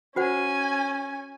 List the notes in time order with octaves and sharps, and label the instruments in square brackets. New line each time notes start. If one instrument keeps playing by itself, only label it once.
[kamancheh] C#4 G#5 [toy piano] F#4 C5 F#5